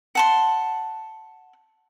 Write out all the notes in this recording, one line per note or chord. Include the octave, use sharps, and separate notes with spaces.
F#5 A5 C6